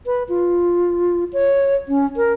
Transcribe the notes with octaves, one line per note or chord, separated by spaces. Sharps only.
B4
F4
C#5
C#4
A#4